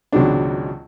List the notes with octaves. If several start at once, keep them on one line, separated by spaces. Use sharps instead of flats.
G#1 C#2 B2 F#3 G#3 D4